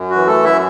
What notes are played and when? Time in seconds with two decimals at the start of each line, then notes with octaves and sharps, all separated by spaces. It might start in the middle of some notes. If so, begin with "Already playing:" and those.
Already playing: F#2
0.10 F#4
0.15 E3
0.27 A3 A4
0.39 F#2
0.44 E4 E5